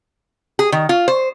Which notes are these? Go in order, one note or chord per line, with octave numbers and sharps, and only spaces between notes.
G#4
D#3
F4
C5